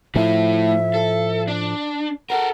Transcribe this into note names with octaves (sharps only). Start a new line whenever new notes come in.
A2 F3 A3 E4 E5
A4
D4
A4 A#4 F#5